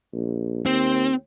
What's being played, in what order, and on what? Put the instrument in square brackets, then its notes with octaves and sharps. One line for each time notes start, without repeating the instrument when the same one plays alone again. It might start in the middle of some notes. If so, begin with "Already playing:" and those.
[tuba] A#1
[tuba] D#2 [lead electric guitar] C4